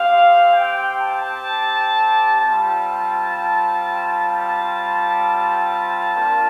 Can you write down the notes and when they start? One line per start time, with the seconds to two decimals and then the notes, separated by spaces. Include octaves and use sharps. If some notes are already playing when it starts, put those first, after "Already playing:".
Already playing: C4 G4 F5
0.52 G5
1.00 A5
2.40 G3 C4 F4 A5
4.27 A5
6.15 A#3 D4 F4